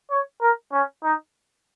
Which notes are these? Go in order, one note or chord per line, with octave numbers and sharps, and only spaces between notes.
C#5
A#4
C#4
D#4